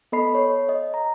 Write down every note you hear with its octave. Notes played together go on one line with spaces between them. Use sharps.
B3 A4 D#5 B5 C7
C#5
D#5
A#5